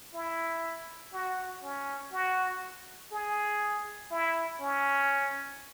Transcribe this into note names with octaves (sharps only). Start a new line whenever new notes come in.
E4
F#4
C#4
F#4
G#4
E4
C#4